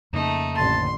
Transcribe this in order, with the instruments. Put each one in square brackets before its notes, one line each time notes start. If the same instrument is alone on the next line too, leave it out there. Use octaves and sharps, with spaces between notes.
[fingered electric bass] F2 C#3 A#3 [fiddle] A3 D#4
[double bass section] A1 D3 [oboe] A5 [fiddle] C6